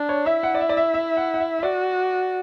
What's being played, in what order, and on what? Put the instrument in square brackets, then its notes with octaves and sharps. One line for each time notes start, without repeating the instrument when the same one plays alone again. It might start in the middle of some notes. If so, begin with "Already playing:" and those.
Already playing: [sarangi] D4
[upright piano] C#5
[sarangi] E4 [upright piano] E5
[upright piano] F#5
D5
E5
D5
E5
E5
F#5
F#5
E5
E5
[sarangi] F#4 [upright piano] D5